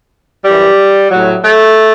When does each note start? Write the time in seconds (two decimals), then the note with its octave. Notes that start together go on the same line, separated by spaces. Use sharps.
0.45 F#2 E3 G3
1.11 A2 F#3
1.45 A3